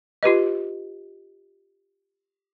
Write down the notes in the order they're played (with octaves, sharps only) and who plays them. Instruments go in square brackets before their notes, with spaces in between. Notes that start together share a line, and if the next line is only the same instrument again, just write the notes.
[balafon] F4 G4 B4 D#5